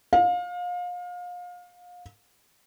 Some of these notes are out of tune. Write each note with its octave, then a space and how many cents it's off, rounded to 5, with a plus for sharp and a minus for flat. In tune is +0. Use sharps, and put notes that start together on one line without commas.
F5 +30